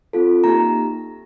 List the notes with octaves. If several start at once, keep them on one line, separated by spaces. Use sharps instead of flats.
C4 F4 A4
A#3 D#4 G4 A#5